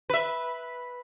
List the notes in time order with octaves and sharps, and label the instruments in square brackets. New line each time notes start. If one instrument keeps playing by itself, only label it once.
[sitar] B4 E5